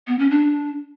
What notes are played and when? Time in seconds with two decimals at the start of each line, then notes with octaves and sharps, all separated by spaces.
0.08 B3
0.19 C#4
0.30 D4